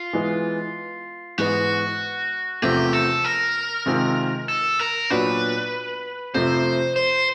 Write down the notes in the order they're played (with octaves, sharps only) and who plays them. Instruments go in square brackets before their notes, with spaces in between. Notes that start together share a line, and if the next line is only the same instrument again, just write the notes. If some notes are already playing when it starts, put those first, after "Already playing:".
Already playing: [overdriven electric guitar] F4
[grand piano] E3 G#3 B3
[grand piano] G#2 E3 G#3 B3 [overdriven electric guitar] F#4
[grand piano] E2 C3 F3 A3 C4 [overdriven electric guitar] G4
[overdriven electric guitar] A4
A#4
[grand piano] C3 D#3 G#3 C4 F4
[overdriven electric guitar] A4
A#4
[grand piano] A#2 F#3 B3 D4 F#4 [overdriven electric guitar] B4
[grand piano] F2 C3 F3 A3 C4 [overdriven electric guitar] C5
[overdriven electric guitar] C5